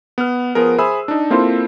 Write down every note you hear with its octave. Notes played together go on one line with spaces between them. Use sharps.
B3 F6
F3 B3 G#4 A#4
G#4 C5 E5 B5 E6
D4 D#4
A#3 C4 E4 F4 A4 C5